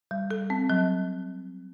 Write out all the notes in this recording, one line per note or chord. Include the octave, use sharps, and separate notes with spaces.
G3
A4
C4
F#3